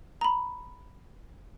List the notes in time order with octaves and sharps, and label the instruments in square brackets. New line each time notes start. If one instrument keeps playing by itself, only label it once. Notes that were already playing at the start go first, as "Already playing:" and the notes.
[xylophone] A#5 B5